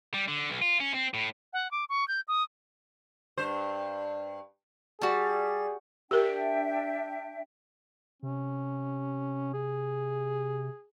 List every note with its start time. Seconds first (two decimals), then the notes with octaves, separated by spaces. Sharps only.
0.14 G3
0.28 D3
0.50 B1
0.62 F4
0.80 C#4
0.94 C4
1.14 A2
1.53 F#5
1.71 D6
1.89 C#6
2.08 G6
2.28 D#6
3.37 G2 C5
5.01 G3 F#4 G#4 A5
6.11 D4 G4 A#4 E5 G5
8.23 C3 C#4
9.54 G#4